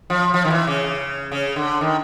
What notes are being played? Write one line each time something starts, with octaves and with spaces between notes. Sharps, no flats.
F3
F3
D#3
E3
C#3
C#3
D3
D#3